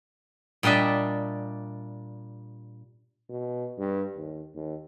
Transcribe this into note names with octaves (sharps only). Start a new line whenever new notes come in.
A#2 G3 D4 D#5 E5
B2
G2
D#2
D#2